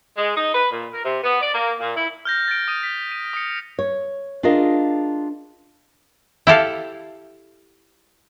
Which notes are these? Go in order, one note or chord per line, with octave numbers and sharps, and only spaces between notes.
G#3
D#4
B4
A#2
A#4
C3
B3
D5
A#3
A#2
E4
F6 G6 A#6
A6 D7
D#6 G6 D#7
B6
D#7
D#6 C#7
C#5
D4 F4 G#4 A#4 D#5 F5
E4 G4 A4 F5